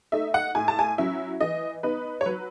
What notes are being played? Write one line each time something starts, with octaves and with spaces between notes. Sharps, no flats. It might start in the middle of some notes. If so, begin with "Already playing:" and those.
A3 D#4 E5
F#5
A2 G#5
A5
G#5
F#3 C#4 E4 E5
E3 D#5
B3 D#4 B4
C#5
F#3 B4